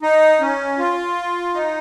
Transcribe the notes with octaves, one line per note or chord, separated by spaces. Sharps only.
D#4
C#4
F4
D#4